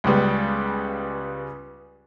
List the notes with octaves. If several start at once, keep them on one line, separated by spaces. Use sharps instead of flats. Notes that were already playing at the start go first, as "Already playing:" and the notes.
C#2 C#3 G3 B3